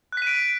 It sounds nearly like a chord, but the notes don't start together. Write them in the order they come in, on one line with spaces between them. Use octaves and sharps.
F#6 B6 D#7 D7